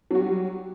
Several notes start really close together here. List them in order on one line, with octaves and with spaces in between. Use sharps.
F#3 F#4 G3